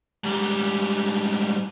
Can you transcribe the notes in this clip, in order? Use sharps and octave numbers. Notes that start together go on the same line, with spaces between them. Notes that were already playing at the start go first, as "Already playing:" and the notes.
G#2 G3